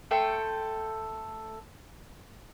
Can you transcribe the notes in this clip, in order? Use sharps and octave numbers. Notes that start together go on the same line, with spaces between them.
A3 A4 G5 C6